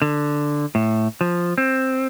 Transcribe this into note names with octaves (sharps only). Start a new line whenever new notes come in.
D3
A2
F3
C4